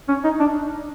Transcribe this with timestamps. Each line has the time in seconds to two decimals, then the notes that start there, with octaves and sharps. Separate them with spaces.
0.09 C#4
0.24 D#4
0.40 D4